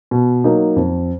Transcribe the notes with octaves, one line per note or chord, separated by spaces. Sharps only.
B2
F#3 A#3 D#4
F2